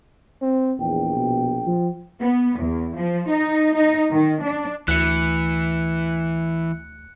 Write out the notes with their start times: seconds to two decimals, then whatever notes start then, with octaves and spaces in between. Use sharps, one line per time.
0.42 C4
0.79 A#1 E2 G5
1.16 B2
1.66 F3
2.20 B3
2.59 E2
2.96 F3
3.29 D#4
3.74 D#4
4.12 D#3
4.43 D4
4.88 D2 E3 F#6 C#7